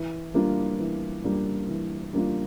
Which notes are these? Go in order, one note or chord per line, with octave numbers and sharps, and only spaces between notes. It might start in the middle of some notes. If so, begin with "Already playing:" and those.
Already playing: E3
G3 A#3 D4 F4
E3
G3 A#3 D4 F4
E3
G3 A#3 D4 F4